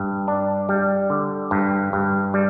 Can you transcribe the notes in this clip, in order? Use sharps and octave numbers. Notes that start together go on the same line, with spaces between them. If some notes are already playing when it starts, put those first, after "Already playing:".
Already playing: G2
D4
G3
D3
G2
G2
G3